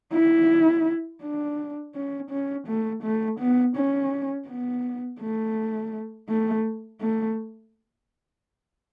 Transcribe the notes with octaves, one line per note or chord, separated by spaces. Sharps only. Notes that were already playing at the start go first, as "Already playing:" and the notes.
E4
D4
C#4
C#4
A3
A3
B3
C#4
B3
A3
A3
A3